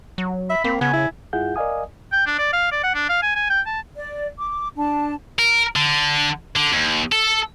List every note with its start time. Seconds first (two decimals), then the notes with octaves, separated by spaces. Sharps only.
0.18 F#3
0.50 E5 B5
0.64 A#3 C4
0.81 C#3 B3 G#5
0.93 E4
1.33 G2 E4 F4 G#4 F#5 G6
1.56 A#4 D5 D#5 F5 G#5 D#6
2.12 G5
2.27 D4
2.39 D5
2.53 F5
2.72 D5
2.83 F#5
2.95 D4
3.09 F5
3.22 G#5
3.35 G#5
3.50 G5
3.66 A5
3.97 D5
4.38 D6
4.76 D4 A5
5.39 A#4
5.76 D3
6.56 D3
6.72 D#2
7.12 A4